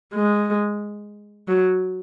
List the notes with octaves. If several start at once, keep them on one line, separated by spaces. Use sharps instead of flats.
G#3
F#3